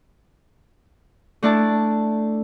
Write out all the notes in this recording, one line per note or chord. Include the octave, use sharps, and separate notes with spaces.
A3 D4 E4 A5